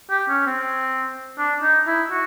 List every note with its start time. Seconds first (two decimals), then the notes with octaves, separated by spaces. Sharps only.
0.10 G4
0.29 C#4
0.46 C4
1.38 D4
1.62 D#4
1.87 E4
2.11 F#4